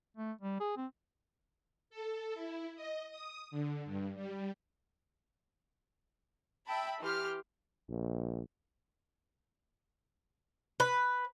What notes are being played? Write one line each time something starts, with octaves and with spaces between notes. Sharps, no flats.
A3
G3
G#4
C4
A4
E4
D#5
D#6
D3
G2
G3
E5 G5 A5 B5
E3 G4 C6 F6
A#1
B4